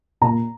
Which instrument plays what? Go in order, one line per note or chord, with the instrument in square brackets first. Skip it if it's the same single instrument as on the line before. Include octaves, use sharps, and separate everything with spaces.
[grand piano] A#2 A#5